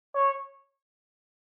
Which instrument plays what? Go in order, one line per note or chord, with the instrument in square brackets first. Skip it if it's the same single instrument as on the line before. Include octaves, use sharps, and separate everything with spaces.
[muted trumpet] C#5